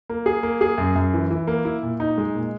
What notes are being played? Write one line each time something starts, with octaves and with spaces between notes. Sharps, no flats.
A#3
G#4
A#3
G#4
F#2
F#2
E3
E3
A#3
E4
A#2
D#4
G#3
A#2